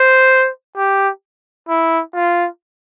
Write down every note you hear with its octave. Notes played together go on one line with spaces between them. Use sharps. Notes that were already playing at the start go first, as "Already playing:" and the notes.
Already playing: C5
G4
E4
F4